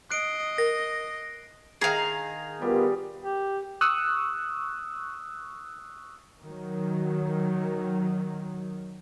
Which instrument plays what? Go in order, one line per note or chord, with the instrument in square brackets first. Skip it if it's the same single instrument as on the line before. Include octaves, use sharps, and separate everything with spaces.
[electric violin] D#5 [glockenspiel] F#6 C7 D7
[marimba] A#4 [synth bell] A#6
[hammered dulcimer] D#3 D#4 A#5 [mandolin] G#4 F5
[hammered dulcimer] G3 [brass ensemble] B3 F4 A#4
[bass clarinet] G4
[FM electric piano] C#6 D#6 E6 F#6
[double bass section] D#3 F#3